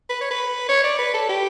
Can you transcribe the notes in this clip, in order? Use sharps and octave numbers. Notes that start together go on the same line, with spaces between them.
B4
C#5
B4
C#5
D5
B4
A4
G4